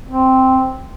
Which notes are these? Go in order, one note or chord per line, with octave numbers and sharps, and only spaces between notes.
C4